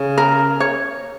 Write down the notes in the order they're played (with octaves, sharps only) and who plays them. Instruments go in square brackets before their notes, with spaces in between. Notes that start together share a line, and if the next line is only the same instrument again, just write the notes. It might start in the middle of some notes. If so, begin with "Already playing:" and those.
Already playing: [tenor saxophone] C#3
[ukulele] A#4
C#5